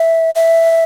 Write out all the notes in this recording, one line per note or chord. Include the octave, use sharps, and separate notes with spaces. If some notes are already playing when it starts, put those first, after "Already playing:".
Already playing: E5
E5